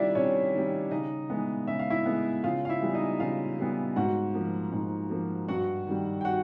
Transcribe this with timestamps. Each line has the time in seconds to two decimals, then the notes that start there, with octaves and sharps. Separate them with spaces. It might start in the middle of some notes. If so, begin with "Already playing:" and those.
Already playing: C3 D#3 G3 D4 E4 F4 D5 E5
0.15 C3 C#4 C#5
0.53 D#3 G3
0.91 C#3 D#4 D#5
1.30 E3 G#3 B3
1.67 C#3 E5
1.79 F5
1.90 E4 E5
2.06 E3 G#3 B3
2.44 C#3 F4 F5
2.65 F5
2.69 E4 E5
2.82 E3 G3 B3
2.94 D#4 D#5
3.20 C#3 F4 F5
3.58 E3 G3 B3
3.96 G#2 F#4 F#5
4.34 F3 A#3
4.72 G#2
5.10 F3 A#3
5.48 G2 F#4 F#5
5.87 D#3 G3
6.21 G5
6.25 F#4 F#5